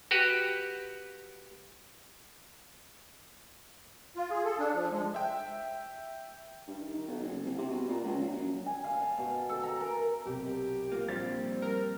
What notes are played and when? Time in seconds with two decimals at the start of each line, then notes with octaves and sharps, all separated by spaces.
0.11 F#4 G4 B4
4.16 F4
4.30 G#4
4.45 A4
4.59 D4
4.74 F3
4.91 G#3
5.15 E5 G5
6.68 G2
6.81 D#3
6.94 D#3
7.08 B1
7.23 F#1
7.45 C2
7.58 C3
7.70 B2
7.89 A#2
8.04 C#2
8.18 A#1
8.33 F#2
8.66 G#5
8.84 F5
9.02 A5
9.18 B2
9.49 A4
9.63 A#5
9.81 A#4
10.25 B1 C3 G4
10.92 A#3 F4
11.08 A#1 A#2 F3 G3 C4 A6
11.62 A#4